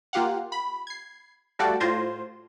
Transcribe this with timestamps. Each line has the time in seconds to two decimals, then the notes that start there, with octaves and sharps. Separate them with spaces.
0.13 A#3 F4 G4 F5 F#5
0.52 B5
0.87 G#6 C7
1.59 G3 A3 F#4 A4 D5 F5
1.80 A2 F4 C5 C6 G#6 A#6